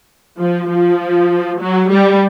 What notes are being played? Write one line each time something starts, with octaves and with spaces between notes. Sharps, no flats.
F3
F3
F#3
G3